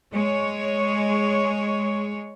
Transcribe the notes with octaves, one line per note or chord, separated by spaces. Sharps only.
G#3 C#5